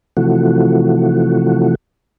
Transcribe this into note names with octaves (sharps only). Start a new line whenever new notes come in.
C3 E3 F3 A3 F#4